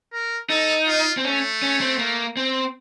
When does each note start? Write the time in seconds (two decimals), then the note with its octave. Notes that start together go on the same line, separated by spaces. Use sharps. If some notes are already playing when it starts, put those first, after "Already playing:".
0.12 A#4
0.50 D#4 A4
0.87 F4
1.17 C4
1.25 A3 C#4
1.62 C#4
1.81 C4
1.99 A#3
2.37 C4